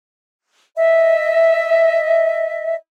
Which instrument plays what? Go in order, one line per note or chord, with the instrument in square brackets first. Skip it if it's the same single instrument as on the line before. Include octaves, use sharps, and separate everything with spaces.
[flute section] D#5 E5